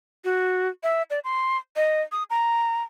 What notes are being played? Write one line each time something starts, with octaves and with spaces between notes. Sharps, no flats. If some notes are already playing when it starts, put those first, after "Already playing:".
F#4
E5
D5
C6
D#5
D#6
A#5